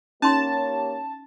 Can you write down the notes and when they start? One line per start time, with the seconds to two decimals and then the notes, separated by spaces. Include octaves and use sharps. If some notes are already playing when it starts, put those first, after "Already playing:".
0.22 A#3 C#4 D#4 G4 C#5 A5 C6